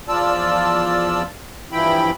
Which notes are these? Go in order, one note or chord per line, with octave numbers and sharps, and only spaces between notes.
E2 F3 F4 D5 A5 E6
G2 E3 F3 E4 G5 B5